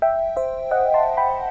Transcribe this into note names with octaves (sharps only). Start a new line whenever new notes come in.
E5 G5
C5 E5
D#5 F#5
A5 C6
G5 B5